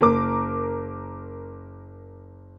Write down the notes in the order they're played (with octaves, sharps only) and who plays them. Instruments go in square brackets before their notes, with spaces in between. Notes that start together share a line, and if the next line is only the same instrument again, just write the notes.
[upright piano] F#1 A#4 D6